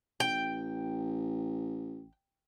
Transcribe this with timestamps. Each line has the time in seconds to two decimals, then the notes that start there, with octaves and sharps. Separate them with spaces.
0.20 A1 G5